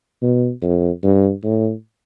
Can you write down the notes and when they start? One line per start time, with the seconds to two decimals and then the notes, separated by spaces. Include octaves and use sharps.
0.22 B2
0.62 F2
1.03 G2
1.44 A2